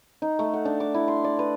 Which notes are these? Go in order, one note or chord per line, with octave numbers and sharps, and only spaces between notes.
D#4
A3
F#5
D4
D6
E4
C6
D5
B4